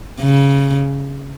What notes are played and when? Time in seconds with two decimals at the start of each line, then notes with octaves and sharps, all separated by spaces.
0.21 C#3